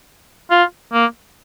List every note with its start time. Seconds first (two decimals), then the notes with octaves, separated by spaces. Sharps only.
0.51 F4
0.93 A#3